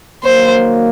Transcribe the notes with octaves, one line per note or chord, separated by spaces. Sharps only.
D#3 F#3 A#3 C5